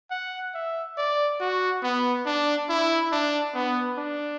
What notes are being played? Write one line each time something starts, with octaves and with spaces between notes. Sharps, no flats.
F#5
E5
D5
F#4
B3
D4
E4
D4
B3
D4